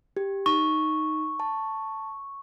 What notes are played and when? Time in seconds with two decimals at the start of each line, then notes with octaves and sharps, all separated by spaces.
0.17 G4
0.46 D#4 C#6
1.40 A5